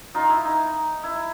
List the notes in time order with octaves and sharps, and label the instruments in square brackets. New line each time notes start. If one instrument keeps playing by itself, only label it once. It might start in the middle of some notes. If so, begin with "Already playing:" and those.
[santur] D#4 F4
E4
D#4
E4